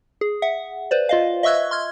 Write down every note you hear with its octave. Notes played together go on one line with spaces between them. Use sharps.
G#4
E5 F#5
B4 C5 D5
F4 D#5 F5
D#5 E5 C#6 E6 F#6 G#6
C6 F6 G#6